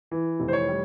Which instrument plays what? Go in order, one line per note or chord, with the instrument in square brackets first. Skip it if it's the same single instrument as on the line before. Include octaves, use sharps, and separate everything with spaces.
[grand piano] E3
F1
C5
C#5
G3